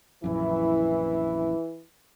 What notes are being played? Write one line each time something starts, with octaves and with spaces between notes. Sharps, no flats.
A#1 F#2 E3 E4